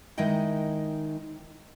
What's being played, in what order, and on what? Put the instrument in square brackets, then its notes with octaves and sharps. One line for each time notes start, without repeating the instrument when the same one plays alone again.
[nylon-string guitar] D#3 G#3 D#4 E4 D#5 G5